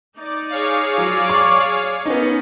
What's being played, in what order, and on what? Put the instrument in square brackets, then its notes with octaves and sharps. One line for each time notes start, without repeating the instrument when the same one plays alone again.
[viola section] D#4 D5
[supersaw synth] G#4 C#5 F5
[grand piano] F#3 [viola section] D5
[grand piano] C#6
[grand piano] B3 D#4 [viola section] C#4